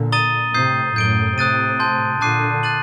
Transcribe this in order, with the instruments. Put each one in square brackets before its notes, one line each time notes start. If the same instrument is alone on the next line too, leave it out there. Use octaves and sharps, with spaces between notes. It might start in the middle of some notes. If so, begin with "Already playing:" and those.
Already playing: [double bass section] A#2 D3
[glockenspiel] A#5 D#6 A6 D#7 G7
[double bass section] A2 C3 [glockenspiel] D#6 G6 C7
[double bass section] F#2 A2 [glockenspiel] G6 D7 G7
[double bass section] A2 C3 [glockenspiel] D#6 F#6 A6 D#7
[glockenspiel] A5 C6 G6
[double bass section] A#2 D3 [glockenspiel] A5 D6 F#6 C7 D#7
[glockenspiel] F#6 A6 D#7 F#7